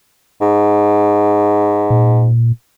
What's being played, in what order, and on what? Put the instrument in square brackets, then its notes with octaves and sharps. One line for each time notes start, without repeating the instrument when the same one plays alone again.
[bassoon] G#2
[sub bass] A#2